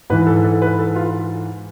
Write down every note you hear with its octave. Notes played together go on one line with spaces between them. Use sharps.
G#2 E3 B4
A4
A4
B4
A4
F4